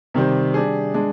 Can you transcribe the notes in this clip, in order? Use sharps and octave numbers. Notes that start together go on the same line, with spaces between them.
C3 D#3 G3 C4
G3 D4 G#4
G#3 D4 G#4